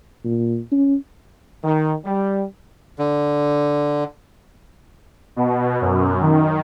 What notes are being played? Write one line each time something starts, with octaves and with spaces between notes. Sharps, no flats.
A#2
C#4
D#3
G3
D3
B2
F#2
D#3